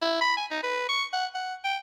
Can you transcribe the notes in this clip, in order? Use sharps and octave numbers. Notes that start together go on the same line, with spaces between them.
E4
B5
G#5
D#4
B4
C#6
F#5
F#5
G5